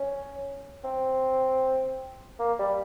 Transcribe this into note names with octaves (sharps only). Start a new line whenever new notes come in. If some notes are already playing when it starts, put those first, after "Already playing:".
Already playing: C#4
C4
A#3
G3